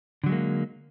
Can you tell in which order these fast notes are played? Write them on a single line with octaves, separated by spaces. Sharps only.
D3 F#3 G#3 A#3